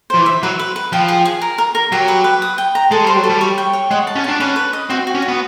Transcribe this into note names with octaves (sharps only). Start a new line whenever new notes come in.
F3 C5
E3
E5
F#3 B4
B4
B4
F3 G5
G#4
G#4
A#4
A#4
A#4
F#3 G4
B4
B4
D#6
G5
A#5
G#3 A4
G3 C5
F#3
A4
G3
C#5
G5
C#5
G#3 F#5
A5
C#4
D4 A5
C#4 B4
B4
D#5
C4 F#4
F#4
C#4
F#4
B3